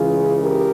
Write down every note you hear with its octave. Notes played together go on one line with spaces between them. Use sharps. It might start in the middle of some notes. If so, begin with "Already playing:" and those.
Already playing: C#2 C#3 E3 F4 G#4
G4 A#4